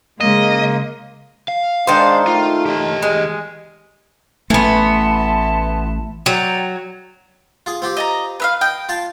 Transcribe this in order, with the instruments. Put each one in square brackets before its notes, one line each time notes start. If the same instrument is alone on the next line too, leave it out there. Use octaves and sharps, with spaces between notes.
[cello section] C#3 G#3 [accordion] A#3 [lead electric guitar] D#5
[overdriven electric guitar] F5
[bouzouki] D#3 C5 [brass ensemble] G#3 D4
[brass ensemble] A3 [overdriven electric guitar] F4
[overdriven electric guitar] G4 D#5
[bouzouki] G#3
[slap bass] A1 A3 [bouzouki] E3 B3 [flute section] E5 A5 C6
[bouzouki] F#3 [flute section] D5 G5 A#5
[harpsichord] F4 G#4
C4 F4 G4
[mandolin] D#5 A5 A#5
B4 E5 F5
[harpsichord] D#5 [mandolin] G5
[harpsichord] F4 F5 A5